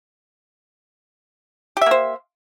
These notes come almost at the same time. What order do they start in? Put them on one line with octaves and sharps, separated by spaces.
G4 E5 A#3 C5